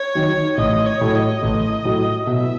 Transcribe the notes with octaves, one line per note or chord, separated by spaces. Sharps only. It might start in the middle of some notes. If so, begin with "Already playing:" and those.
Already playing: C#5
D#3 F#3
A1 D#5
C#5
A2 F#3
D#5
A1
A2 F#3
B2 E5